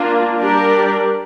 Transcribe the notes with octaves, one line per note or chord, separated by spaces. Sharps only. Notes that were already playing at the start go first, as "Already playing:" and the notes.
Already playing: A#3 D4 F4
G3 D4 G4 A#4 D5